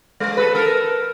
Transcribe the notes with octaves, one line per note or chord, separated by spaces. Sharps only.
G#3
A4 B4
A4 A#4